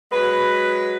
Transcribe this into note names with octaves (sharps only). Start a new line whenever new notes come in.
F#3 G#3 B4